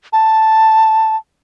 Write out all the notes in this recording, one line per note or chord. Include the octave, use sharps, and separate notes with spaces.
A5